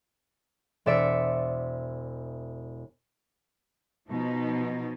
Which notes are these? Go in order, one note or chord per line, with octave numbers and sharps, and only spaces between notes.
E1 C5 D5 E5 C#7 D7
B2 F3 D#4